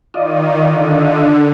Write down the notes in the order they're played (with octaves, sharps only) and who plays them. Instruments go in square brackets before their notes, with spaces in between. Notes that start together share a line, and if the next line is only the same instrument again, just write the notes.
[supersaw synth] D#3 [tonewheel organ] F4 D5 D#5
[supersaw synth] D3